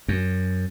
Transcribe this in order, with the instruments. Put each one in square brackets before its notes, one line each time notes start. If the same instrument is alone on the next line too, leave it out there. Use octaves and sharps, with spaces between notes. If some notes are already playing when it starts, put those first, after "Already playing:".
[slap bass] F#2